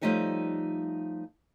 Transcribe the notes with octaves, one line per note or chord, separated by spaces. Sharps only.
F3 G3 A3 D#4 G4 C#5